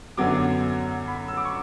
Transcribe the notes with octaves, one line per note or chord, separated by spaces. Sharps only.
F#2 D3 F#3 B3 D6
B5
E6
D6
C#6